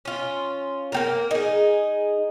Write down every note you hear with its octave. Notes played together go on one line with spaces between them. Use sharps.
C#4 F4
A#3 C4 A#4
D#4 G#4